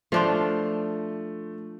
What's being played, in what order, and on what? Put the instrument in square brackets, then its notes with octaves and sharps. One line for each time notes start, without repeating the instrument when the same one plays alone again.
[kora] F3 D4 F4 [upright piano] A3